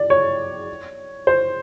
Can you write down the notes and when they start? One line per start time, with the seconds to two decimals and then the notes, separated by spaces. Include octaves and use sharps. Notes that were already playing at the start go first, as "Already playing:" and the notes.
Already playing: D5
0.10 C#5
1.27 C5